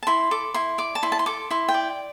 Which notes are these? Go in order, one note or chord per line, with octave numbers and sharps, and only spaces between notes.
A5
E4 C6
A4 D6
E4 C6
D5 D6
A5
E4 C6
A5
C6
A4 D6
E4 C6
G5
D5